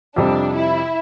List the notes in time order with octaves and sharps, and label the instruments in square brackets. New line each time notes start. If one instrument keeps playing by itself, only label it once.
[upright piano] F2 C3 G3 [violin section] D4
[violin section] E4